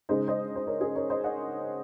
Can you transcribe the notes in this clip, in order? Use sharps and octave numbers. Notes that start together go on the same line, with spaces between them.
C#3 G#3 D#4 C5 D#5
C5 D#5
C5
A#4 C#5
G#4
A#4 C#5
C5 D#5
D#5 F#5